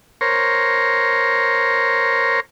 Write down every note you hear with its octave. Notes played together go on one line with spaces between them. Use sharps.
A#4 C5 C#5